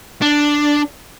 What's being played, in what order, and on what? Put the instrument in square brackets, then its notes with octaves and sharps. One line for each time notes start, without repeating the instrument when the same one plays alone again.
[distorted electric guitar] D4